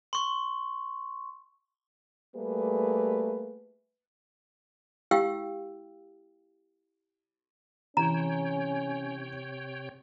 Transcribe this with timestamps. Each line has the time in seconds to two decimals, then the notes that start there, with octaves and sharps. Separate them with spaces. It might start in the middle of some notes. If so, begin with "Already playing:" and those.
0.13 C6 C#6
2.35 G3 A3 A#3 G#4 B4
5.11 E4 G4 F5 G5 E6
7.97 C3 E3 C#4 E4 C#5 G5 A#5